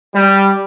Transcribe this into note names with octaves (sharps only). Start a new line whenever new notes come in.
G3